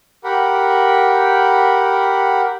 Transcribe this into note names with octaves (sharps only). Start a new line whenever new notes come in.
G4 A#4 F#5 B5